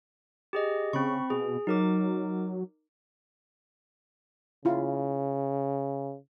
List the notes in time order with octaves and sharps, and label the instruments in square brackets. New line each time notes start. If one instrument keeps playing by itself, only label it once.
[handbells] G4 G#4 D#5
[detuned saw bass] C#3 [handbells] C4 B5 C#6
[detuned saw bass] B2 [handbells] G#4
[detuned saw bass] F#3 [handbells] D#4 A#4 D6
[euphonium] C#3 [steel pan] E4 F4